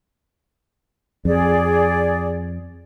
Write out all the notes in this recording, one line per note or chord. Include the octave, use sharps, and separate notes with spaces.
F2 G#4 D5